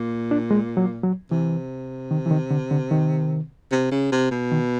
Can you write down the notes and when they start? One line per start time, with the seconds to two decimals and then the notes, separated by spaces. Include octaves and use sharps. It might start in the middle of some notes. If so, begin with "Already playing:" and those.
Already playing: A#2
0.31 D4
0.51 G#3
0.77 F#3
1.03 F#3
1.31 C3 E3
2.11 D#3
2.26 E3
2.31 D#3
2.51 D3
2.71 D3
2.91 D#3
3.72 C3
3.91 C#3
4.12 C3
4.32 B2
4.52 D#3